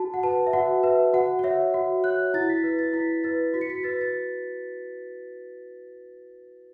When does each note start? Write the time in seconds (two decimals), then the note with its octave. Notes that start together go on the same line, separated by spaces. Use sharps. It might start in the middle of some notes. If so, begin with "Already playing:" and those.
Already playing: F#4 A5
0.14 F#5
0.23 B4 A5
0.47 E5
0.53 F#4 F#5
0.83 B4 E5
1.13 F#4 F#5
1.39 F#5
1.43 C#5 E5
1.74 F#4 F#5
2.04 C#5 F#6
2.34 E4 A6
2.49 B6
2.64 B4
2.79 A6
2.93 E4 B6
3.24 B4 A6
3.54 F#4 B6
3.61 C#7
3.70 B6
3.83 B4 A6
3.93 B6
4.01 A6